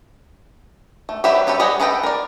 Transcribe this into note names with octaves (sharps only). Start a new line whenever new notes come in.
A3
F#3 G3 G4 B4 E5
F#3 G4 A4 B4
G3 G#4 B4 D#5 F#5
G#4 A4 B4 D#5 G5
A#4 D5